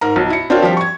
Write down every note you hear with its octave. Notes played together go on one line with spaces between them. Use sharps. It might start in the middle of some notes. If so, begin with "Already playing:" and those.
G#2 A#4 A#5
B1
E4 C#7
C4 D4 F4 F#4 A#4 C#5
F3 G3 G4
C#6 G#6